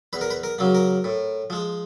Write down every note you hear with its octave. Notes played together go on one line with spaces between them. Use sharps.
E2 B4
A#4
B4
A#4
C#3 F#3 A#3
A#4
A2
F3 G#3